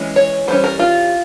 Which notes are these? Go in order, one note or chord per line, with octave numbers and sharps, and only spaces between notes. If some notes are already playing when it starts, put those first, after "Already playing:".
Already playing: E3 G#3 C#4
C#5
E3 G3 C#4 C5
A#4
F4